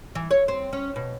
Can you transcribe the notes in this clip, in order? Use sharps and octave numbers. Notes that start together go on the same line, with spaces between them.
E3
C#5
C4
C#4
B2